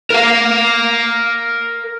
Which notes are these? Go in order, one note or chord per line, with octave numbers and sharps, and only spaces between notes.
A#4 F5